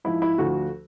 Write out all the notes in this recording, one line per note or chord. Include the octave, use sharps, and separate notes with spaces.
G#2 F3 E4
E4
D2 D3 F3 F#4